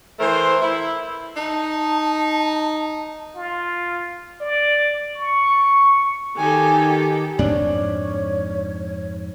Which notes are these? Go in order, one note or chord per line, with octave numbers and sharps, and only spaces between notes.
E3 A3 A#4 C5
E4
D#4 A5
F4
D5
C#6
D#3 G4 A4 G#5
F2 G#2 C4 D4 C#5